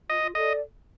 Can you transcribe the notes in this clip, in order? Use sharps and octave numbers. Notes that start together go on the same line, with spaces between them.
F4 D#5
A4 D5 D#5